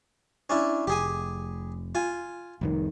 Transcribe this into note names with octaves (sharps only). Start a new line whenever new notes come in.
C#4 D4 E4
F1 G4 G#4 G#5
F4 G#5
F1 C2 D#3